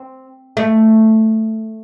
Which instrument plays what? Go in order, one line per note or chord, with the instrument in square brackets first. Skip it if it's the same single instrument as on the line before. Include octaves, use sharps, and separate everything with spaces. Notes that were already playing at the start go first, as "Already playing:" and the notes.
Already playing: [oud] C4
A3